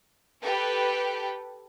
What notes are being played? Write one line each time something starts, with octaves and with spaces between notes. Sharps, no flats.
G4 A4 B4